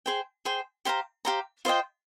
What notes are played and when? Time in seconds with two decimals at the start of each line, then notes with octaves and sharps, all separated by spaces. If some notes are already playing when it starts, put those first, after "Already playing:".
0.06 G#4 C5 G5
0.45 G#4 C5 G5
0.85 G4 C5 F5 A#5
1.25 G4 C5 F5 A#5
1.65 F4 C5 D#5 G5